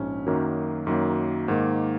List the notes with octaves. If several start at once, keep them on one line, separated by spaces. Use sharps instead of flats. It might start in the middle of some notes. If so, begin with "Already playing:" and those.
Already playing: A#1 G#2 C#4
F#2 D#3 F#3 A#3
F#2 D#3 F#3 A#3
G#2 D#3 A#3